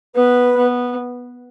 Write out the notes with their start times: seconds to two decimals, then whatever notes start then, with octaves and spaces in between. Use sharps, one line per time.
0.15 B3 B4
0.57 B3